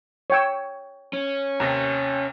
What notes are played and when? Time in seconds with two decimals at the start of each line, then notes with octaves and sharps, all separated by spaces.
0.30 C#5 G5 E6
1.13 C#4
1.60 D#2 C3 A#5